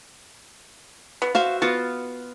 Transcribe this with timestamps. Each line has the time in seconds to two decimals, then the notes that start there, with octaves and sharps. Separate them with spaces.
1.22 B3
1.35 F#4 C5 E5 F5
1.62 B3 F4 F#4